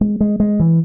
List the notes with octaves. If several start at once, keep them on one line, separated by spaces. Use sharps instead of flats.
G#3
G#3
G#3
E3